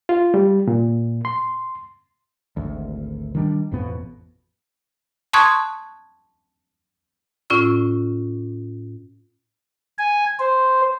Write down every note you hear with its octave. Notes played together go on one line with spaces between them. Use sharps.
F4
G3
A#2
C6
G#1 D2
D#3 G3 D4
A1 F2 B2 B3
A5 C6 C#6 D#6 F#6 G#6
A2 C#4 F4 D5 C#6 E6
G#5
C5